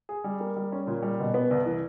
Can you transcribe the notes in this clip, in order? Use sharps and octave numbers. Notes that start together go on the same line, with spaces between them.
G#4
G3
A#3
G3
C#4
A#2
G3
B2
B3
C2
E3